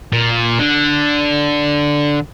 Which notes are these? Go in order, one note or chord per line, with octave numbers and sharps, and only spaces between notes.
A#2
D3